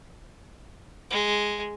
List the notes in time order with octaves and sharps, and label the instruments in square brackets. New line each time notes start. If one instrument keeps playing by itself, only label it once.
[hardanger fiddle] G#3